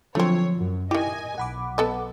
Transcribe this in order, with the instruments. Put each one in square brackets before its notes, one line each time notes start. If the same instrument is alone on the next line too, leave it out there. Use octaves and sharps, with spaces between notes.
[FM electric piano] D3 F3 F#3 [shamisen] A3 C4 [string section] C#5
[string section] F#2
[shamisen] D#3 G4 [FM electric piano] E4 [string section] D#5 G#5
[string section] B1 [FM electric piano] F#5 B5 D6
[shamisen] B3 A4 D#5